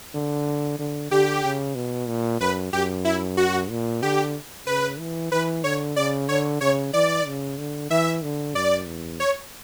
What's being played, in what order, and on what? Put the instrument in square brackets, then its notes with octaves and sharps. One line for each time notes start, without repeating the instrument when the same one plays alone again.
[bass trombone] D3
D3
[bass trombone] D3 [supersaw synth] G4
[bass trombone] C#3
B2
A#2
[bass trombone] F#2 [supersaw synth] B4
[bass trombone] F#2 [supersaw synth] G4
[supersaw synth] E4
F#4
[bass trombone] A#2
[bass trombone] D3 [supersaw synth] G4
[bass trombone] C#3 [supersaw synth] B4
[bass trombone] E3
[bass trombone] E3 [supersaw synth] B4
[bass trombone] D3 [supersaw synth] C#5
[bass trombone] C#3 [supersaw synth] D5
[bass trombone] D3 [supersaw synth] C#5
[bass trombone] C#3 [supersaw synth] C#5
[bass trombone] E3 [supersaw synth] D5
[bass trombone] C#3
D3
[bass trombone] E3 [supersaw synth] E5
[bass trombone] D3
[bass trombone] F#2 [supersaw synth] D5
[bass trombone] E2
[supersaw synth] C#5